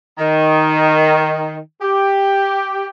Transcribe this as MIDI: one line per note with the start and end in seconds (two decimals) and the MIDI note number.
0.19 1.57 51
1.82 2.86 67